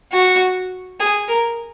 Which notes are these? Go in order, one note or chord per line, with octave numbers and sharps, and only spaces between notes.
F#4
G#4
A#4